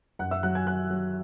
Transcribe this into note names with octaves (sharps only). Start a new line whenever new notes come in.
F#2 F#5 F#6
E5 E6
F#3 F#5 F#6
G#5 G#6
F#3 F#5 F#6
F#3